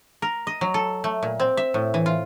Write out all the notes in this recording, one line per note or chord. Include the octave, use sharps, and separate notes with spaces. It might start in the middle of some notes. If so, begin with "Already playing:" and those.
A#4
D#5
F#3
A4
A3
A#2
C4
E5
A2
E3
F4